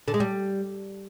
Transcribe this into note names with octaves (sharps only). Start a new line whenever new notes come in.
D3
G#3
G3